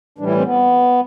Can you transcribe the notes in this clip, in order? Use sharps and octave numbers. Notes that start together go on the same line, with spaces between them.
A2 E3 G3 D4
E4
C4
B3